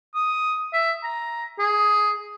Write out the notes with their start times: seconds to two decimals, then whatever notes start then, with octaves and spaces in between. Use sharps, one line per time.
0.15 D#6
0.73 E5
1.04 A#5
1.59 G#4